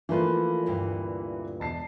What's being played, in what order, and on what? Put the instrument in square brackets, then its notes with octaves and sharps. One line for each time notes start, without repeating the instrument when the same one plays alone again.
[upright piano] E3 A#3 B4 [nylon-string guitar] F3 A3 F4
[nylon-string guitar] D2 G2 A#2
[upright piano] E1 A5 C7